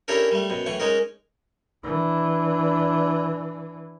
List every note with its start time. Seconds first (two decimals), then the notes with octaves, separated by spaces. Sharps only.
0.08 C#4 D4 E4 G4 A4 A#4
0.31 G3 A3
0.50 F#2 B2
0.66 A2 E3 C#6
0.80 G#3 C#4 D#4 A#4
1.84 E3 D4